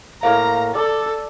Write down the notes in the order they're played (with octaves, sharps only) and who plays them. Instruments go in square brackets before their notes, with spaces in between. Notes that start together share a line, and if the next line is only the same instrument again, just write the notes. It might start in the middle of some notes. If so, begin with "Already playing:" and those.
[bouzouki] A2 A#3 F5 [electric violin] A#5
[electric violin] A4 [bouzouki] D5